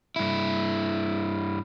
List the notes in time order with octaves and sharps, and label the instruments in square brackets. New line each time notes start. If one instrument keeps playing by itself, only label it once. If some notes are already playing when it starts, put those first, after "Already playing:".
[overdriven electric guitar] G2 E4